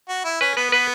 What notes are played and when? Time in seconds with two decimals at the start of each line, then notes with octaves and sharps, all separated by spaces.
0.09 F#4
0.24 E4
0.41 C#4 B4
0.57 B3 B4
0.72 B3 B4